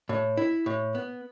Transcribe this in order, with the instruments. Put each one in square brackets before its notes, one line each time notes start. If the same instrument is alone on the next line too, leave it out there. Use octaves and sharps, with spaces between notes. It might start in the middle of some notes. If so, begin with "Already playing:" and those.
[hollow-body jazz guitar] A2
E4
A2
B3